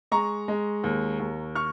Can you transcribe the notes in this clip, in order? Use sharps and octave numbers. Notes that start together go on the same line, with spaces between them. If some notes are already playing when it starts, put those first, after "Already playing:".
G#3 A#5 C#6
G#3
D#2
D#2
C#6 F6